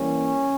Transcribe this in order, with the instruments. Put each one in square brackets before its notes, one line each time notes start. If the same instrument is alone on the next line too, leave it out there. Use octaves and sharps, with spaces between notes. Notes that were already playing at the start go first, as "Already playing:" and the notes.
Already playing: [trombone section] E3 G3 A#3 C#4